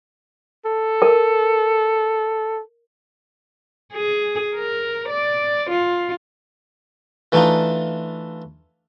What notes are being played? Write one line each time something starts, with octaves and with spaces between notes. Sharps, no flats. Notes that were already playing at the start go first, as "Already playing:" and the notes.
A4
A#4
G#4
A#4
D5
F4
E3 A3 D4 D#4 F4